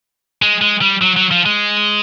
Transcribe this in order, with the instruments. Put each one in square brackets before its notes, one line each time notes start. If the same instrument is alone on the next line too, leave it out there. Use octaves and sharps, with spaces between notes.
[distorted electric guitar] G#3
G#3
G3
F#3
F#3
F3
G#3